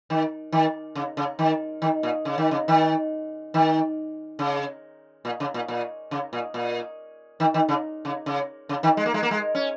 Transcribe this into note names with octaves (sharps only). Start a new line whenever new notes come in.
D#3
D#3
C#3
C#3
D#3
D#3
A#2
C#3
D#3
C#3
D#3
D#3
C#3
A#2
C#3
A#2
A#2
C#3
A#2
A#2
D#3
D#3
C#3
C#3
C#3
C#3
D#3
G#3
A#3
G#3
A#3
G#3
C#4